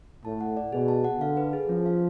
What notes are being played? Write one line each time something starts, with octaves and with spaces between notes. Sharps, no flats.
A2 A5
F#5
D5
B2 G#4
A5
F#5
D3 F5
B4
G#4
F3 C#4
F5